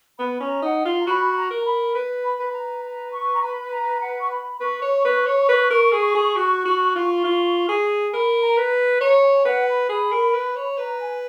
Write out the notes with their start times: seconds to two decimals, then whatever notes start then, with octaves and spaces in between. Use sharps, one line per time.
0.19 B3 B5
0.40 C#4 A#5
0.62 D#4 F#5
0.85 F4 F5
1.01 A#5
1.07 F#4 B5
1.36 A#5
1.50 A#4
1.66 B5
1.95 B4
2.24 B5
2.40 B4
2.54 A#5
2.84 A#5
3.12 C#6
3.33 A#5
3.42 B5
3.71 A#5
4.01 F#5
4.19 C#6
4.30 B5
4.60 B4 C#6
4.82 C#5
5.04 B4
5.26 C#5
5.49 B4
5.70 A#4
5.92 G#4
6.15 G#4
6.36 F#4
6.65 F#4
6.95 F4
7.24 F4
7.68 G#4
8.13 A#4 B5
8.42 A#5
8.56 B4
9.00 C#5 A#5
9.23 G#5
9.45 B4 F#5
9.67 B5
9.89 G#4
10.12 A#4
10.34 B4
10.56 C#5
10.77 B4 A#5
11.00 G#5